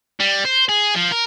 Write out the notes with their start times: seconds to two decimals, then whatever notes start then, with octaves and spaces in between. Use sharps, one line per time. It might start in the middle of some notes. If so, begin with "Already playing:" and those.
0.20 G3
0.45 C5
0.69 G#4
0.95 F3
1.12 A#4